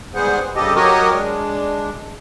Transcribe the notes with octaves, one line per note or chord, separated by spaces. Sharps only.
G#2 G3 B3 G#4 C5 F#5
G2 C#3 G4 A4 D#5
F#3 F#4 G4 A#4 C#5 D#5
G#3 D4